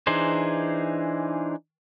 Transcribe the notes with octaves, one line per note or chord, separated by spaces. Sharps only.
E3 D4 D#4 G#4 C5